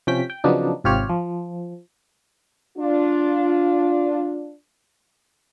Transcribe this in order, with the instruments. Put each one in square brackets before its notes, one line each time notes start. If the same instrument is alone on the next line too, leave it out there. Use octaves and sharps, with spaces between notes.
[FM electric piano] C3 F3 C#4 G5 B6
G5
C#3 F3 F#3 B3 D4 D#4
G#1 C3 F4 G4 C#5 F6
F3
[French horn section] D4 F4